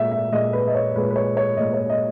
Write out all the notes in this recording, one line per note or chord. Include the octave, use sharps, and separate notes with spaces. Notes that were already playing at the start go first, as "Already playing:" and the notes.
Already playing: A#2 G#3 E5
E5
A#2 G#3 D#5
B4
D#5
C#5
A#2 G#3 B4
B4
C#5
C#5
A#2 G#3 D#5
C#5
D#5